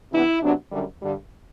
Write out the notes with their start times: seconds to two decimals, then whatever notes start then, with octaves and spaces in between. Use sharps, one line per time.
0.12 C3 E3 B3 D4 E4
0.42 C3 F#3 B3 D4
0.72 F#2 D3 G3
1.02 G2 D3 G3